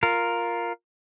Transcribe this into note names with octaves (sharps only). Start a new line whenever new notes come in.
F4 A#4